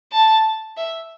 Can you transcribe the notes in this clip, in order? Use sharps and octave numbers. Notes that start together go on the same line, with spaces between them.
A5
E5